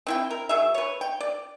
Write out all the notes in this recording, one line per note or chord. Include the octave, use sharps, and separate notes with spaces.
C4 E4 G5
A#4
F#3 G#4 E5
B4 C#5
G5
D5